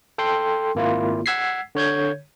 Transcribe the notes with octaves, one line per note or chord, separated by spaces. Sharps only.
A4 G5 C6
G#1 A#3 E4 F4
F#5 E6 G#6 B6 C7
D3 C#5 G6 G#6